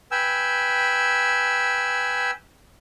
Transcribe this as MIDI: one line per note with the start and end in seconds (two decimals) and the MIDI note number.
0.11 2.31 71
0.11 2.31 79
0.11 2.31 80
0.11 2.31 88